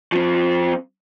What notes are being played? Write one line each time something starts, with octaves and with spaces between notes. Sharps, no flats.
F3 C4